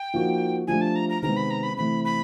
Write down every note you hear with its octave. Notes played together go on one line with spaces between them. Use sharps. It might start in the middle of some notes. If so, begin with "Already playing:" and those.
Already playing: G5
F3 A#3 D#4 F#4
F3 A3 D4 G4 G#5
A5
A#5
A#5
C3 D#3 G#3 B3 A#5
B5
A#5
B5
C3 E3 A3 C4 B5
B5